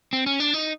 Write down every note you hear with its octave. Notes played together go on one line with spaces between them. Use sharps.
C4
C#4
D4
D#4